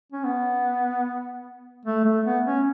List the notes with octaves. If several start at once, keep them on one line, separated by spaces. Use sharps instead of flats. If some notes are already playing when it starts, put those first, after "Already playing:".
C#4
B3
A3
A3
B3
C#4